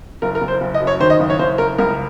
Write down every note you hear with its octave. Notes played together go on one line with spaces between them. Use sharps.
F#1 A#4
A#4
F#1
C5
F#1
D#5
F#2
C#5
D#3 C5
D#5
F#1
C#5
F#1 C5
F#1 A#4
C#2 A#4